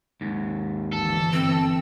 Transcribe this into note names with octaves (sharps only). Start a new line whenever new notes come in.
D#2 G#2
G1 E3 A4 E6
C4